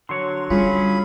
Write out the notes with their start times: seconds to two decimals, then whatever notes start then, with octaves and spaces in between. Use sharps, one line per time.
0.09 D3 F#3 C#5 C6
0.50 G3 C#4 F4 G#4 B5